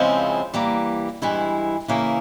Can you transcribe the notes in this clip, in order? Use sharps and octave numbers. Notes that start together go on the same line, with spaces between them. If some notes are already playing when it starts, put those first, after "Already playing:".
Already playing: C#3 F3 G#3 C4 E4
E3 G3 A#3
G2 E3 G#3 E4
C#3 E3 A#3 E4